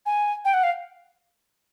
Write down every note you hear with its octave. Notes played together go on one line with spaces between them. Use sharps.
G#5
G5
F#5
F5